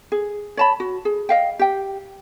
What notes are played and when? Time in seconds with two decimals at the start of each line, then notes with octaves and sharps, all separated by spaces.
0.12 G#4
0.57 C#5 A5 B5
0.80 F#4
1.05 G#4
1.29 D#5 F5 G5
1.59 G4 G5